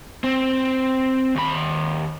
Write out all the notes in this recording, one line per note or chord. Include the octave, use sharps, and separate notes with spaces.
C4
D#2 B5